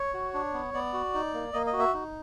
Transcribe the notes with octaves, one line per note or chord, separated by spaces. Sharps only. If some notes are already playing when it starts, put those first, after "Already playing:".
Already playing: C#5
F#4
D4
B3
B3 D5
F#4
D#4
A#3
A#3 D#5
D#5
F#4
E5
D#4